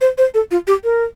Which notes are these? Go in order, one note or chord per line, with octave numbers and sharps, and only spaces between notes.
C5
C5
A4
F4
G4
A#4